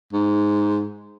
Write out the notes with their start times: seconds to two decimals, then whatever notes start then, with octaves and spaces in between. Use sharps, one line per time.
0.13 G#2